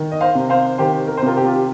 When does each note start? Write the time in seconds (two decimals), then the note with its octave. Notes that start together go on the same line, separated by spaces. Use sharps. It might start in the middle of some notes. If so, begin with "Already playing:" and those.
Already playing: D#3
0.12 D#5
0.21 C5 F5
0.35 C3
0.50 C5 F5
0.78 D#3 G4 C5
1.07 A#4
1.17 C5
1.23 C3 F4 A#4
1.37 G4
1.46 F4
1.55 G4